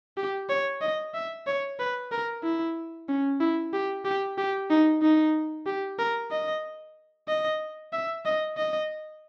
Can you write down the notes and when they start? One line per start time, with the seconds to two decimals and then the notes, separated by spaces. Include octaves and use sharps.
0.17 G4
0.49 C#5
0.81 D#5
1.14 E5
1.46 C#5
1.79 B4
2.12 A#4
2.43 E4
3.08 C#4
3.40 E4
3.73 G4
4.05 G4
4.38 G4
4.70 D#4
5.02 D#4
5.66 G4
5.99 A#4
6.31 D#5
7.28 D#5
7.93 E5
8.25 D#5
8.57 D#5